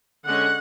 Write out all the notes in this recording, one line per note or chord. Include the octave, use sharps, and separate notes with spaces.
D3 G#3 C#4 F#5